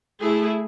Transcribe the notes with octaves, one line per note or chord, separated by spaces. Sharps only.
A3 E4 G#4